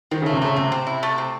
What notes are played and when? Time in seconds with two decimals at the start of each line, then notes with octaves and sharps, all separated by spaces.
0.11 D#3 C4
0.22 C#3
0.26 A3
0.33 C3
0.41 C#3 A3
0.56 C3 C4
0.72 C4
0.87 E4
1.03 A3
1.18 C4